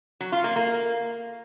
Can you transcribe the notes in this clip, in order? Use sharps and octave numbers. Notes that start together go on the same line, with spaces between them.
F#3
F4
A#3
A#3